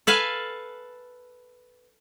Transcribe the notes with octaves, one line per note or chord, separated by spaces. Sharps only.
A4 B4 F5 G#5